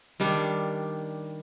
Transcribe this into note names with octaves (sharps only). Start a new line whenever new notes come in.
D#3 G3 D4